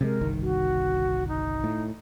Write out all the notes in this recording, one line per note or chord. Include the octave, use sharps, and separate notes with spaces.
C3 G3 G#3 A#4
G1 C2 D#3
F#4
D#4
A2